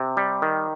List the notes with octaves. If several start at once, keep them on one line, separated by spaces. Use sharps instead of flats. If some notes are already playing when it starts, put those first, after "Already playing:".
Already playing: C3
G3
D#3